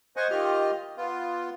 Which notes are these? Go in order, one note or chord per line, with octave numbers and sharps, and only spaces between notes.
C5 D#5 F#5 G#5 C#6
D#3 F4 G4 D#5 F6
B3 F4